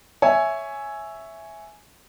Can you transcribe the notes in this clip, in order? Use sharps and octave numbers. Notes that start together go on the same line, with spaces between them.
C#5 E5 G#5